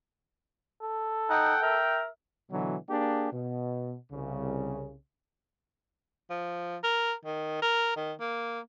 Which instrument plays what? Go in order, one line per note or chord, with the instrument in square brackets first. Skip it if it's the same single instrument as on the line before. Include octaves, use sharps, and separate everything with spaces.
[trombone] A4
[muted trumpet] D#4 [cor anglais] F#5 [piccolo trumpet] G5
[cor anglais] A#4 [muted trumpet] E5
[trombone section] B2 D3 E3 F#3
A#3 D4 G4 G#4
B2
C2 C#3
[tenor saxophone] F3
A#4
D#3
A#4
D#3
A#3